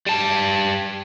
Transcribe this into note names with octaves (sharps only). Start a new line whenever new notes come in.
G3 A5